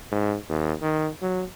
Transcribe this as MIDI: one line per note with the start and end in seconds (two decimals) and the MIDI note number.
0.12 0.36 44
0.49 0.73 39
0.82 1.09 51
1.22 1.44 54